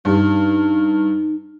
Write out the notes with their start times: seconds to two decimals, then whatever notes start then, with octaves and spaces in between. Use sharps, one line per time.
0.05 G2 D#4